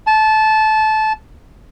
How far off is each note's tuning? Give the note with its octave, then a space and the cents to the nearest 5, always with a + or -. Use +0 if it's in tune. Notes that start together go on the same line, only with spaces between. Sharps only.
A5 -20